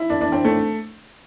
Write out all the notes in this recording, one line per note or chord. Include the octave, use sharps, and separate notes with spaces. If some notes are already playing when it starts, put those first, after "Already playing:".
Already playing: E4
D4
D4
C4
A3